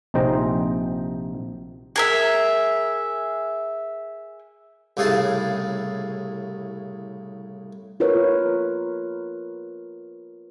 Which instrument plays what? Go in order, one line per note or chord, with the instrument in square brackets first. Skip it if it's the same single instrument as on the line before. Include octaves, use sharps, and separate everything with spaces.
[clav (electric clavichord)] A#1 C3 D#4 C5 G5 A#5
[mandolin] G#4 A#4 E5
[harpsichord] C2 A2 C#3 G#4 F5 A5
[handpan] F4 A#4 B4 C#5